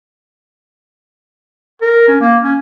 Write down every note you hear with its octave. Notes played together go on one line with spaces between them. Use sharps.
A#4
C#4
A#3
C#4